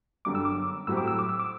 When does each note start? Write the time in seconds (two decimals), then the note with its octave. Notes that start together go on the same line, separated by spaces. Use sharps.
0.25 G1 F#2 D3 G3 D6
0.35 E6
0.45 D6
0.87 A2 F#3 C4 G4 E6
0.97 D6
1.07 E6
1.19 D6
1.29 E6
1.39 D6